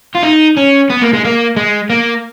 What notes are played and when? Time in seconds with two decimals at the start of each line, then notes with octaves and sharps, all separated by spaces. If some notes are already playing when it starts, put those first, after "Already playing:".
0.15 F4
0.23 D#4
0.57 C#4
0.90 B3
1.01 A#3
1.13 G#3
1.25 A#3
1.57 G#3
1.90 A#3